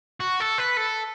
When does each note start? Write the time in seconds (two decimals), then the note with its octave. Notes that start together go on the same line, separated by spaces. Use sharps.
0.20 F#4
0.40 A4
0.58 B4
0.77 A4